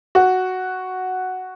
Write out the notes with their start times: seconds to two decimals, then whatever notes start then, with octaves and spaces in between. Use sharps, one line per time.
0.15 F#4